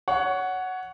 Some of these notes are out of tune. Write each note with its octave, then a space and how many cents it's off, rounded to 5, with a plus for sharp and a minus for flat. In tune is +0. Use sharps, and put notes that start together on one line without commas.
C#5 +15 F#5 +0